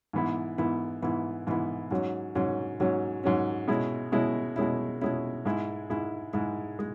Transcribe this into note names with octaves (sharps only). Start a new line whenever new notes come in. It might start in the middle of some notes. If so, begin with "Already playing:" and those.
G#2 E3 B3 E4
G#2 E3 B3 E4
G#2 E3 B3 E4
G#2 E3 B3 E4
G#2 F#3 C#4
G#2 F#3 C#4
G#2 F#3 C#4
G#2 F#3 C#4
B2 G#3 C#4 E4
B2 G#3 C#4 E4
B2 G#3 C#4 E4
B2 G#3 C#4 E4
G#2 G#3 E4
G#2 G#3 E4
G#2 G#3 E4
G#3